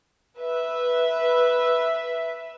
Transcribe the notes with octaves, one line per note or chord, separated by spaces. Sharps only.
B4 E5